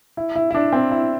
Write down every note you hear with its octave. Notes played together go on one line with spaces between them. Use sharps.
E4
E4
E4
D4
C4
E4